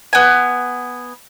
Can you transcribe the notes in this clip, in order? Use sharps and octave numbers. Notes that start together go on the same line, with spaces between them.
B3 G#5